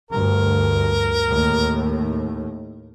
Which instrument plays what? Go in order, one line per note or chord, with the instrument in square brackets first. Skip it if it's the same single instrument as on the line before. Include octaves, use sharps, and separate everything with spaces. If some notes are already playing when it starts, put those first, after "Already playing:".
[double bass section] D2 G2 [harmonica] A#4
[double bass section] D#2 A2